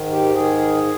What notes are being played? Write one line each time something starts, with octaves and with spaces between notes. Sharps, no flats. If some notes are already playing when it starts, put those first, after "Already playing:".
Already playing: G#2 D#3
G4
D#3 G#4